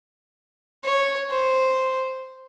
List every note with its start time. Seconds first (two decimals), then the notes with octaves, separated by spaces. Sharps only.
0.84 C#5
1.31 C5